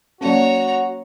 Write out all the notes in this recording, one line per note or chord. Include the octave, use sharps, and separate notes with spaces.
F#3 A#3 C#4 F#4 C#5 A#5